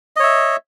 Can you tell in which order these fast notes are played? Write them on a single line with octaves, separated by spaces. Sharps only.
D#5 C#5 E5